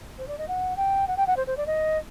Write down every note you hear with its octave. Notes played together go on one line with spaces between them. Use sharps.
C5
D5
D#5
F#5
G5
F#5
G5
F#5
C5
C5
D5
D#5